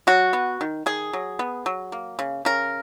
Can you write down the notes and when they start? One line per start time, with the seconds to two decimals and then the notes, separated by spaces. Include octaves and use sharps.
0.07 F#3 F#4
0.33 B3
0.61 D#3
0.86 D#3 G#4
1.13 F#3
1.39 B3
1.66 F#3
1.92 A#3
2.19 C#3
2.45 C#3 A#4